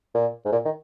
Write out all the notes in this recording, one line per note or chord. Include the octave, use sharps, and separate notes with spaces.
A#2
G#2
A#2
D#3